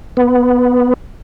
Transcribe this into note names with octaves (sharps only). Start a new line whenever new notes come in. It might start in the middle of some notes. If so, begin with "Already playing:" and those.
B3